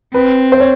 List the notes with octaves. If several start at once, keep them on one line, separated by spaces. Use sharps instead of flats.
C4 B4
C5
C#5